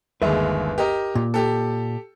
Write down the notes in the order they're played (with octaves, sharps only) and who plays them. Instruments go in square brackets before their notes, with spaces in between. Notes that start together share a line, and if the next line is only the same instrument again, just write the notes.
[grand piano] G1 D#2 G#3 [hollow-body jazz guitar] B4 E5
[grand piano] G4 A#4 D#5
[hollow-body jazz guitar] A#2
[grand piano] G4 A4